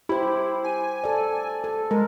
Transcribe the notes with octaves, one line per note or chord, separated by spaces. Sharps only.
E4 G4 C5
G#5
A4 D5
A4
G#3 A#4